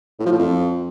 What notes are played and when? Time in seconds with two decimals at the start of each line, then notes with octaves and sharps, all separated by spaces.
0.20 A2
0.26 F3
0.32 A2
0.39 F2